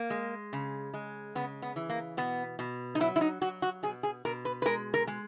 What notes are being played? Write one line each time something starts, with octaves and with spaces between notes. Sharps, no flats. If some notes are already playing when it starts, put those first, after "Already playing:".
Already playing: A#3
G#3
C#3
G#3
C#3 B3
B3
E3
A#3
B2 B3
B2
D#4
F#3 E4
E4
D#4
F#3 F#4
F#4
B2 G#4
G#4
B2 A#4
B4
B4
G#3 A#4
A#4
G#3